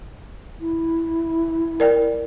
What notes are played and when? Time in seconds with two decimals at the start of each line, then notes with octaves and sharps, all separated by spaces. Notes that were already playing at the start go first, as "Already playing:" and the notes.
0.61 E4
1.80 A#4 D5 G5